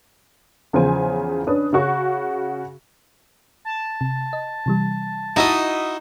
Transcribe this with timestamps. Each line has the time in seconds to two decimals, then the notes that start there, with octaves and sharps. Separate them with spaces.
0.73 E2 C#3 F3 C5 G#5
1.47 C#4 D4 B4 D#6
1.73 C#3 C#4 F#4 C#6
3.65 A5
4.01 C3
4.33 D#5
4.66 C3 E3 G3
5.36 D#4 E4 F#4 D#5